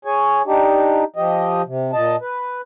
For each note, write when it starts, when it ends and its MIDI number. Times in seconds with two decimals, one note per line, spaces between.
0.05 0.42 68
0.05 0.42 73
0.05 0.42 80
0.46 1.04 62
0.46 1.04 63
0.46 1.04 67
1.16 1.62 53
1.16 1.62 67
1.16 1.62 75
1.66 1.92 48
1.93 2.16 46
1.93 2.16 75
1.93 2.16 81
2.21 2.61 71